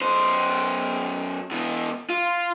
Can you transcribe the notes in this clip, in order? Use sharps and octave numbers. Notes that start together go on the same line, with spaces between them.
F#2 C5
B2 E3
F4